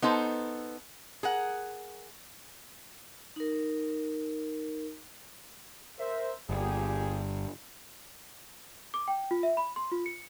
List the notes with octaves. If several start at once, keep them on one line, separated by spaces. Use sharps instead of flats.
B3 D#4 A4 C5
G#4 A#4 F#5
D#4 A#4
A#4 C5 E5
G1 A#2 G4 G#4
D6
G5
F4
E5
B5
C6
F4
C#7